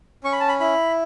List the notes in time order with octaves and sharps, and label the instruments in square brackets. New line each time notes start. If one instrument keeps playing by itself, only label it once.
[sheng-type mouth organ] C#4 C#6
B5
A5
B5
E4 B5